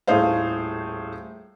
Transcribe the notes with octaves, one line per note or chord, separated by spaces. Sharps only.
D#1 A2 G#4 A4 C5 F5